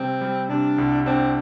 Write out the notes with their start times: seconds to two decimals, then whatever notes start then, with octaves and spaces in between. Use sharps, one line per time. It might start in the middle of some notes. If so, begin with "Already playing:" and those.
Already playing: C3 G3 C4
0.21 G3
0.49 C3 D4
0.78 C2
1.06 C4 D4